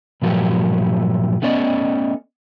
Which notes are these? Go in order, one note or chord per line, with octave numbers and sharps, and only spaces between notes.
G2 A#2 F3 F#3 A3 G4
A3 B3 C#4 D5 D#5